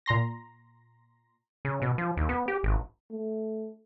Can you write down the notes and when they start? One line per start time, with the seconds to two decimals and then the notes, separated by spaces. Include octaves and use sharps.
0.06 A#2 A#5 C6 A#6
1.65 C#3
1.82 B2
1.98 F3
2.17 D#2
2.29 B3
2.48 G4
2.63 G#1
3.11 A3